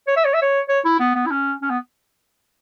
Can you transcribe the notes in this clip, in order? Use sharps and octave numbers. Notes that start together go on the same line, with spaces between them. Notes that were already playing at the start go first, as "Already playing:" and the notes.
C#5
E5
C#5
E5
C#5
C#5
E4
B3
B3
E4
C#4
C#4
B3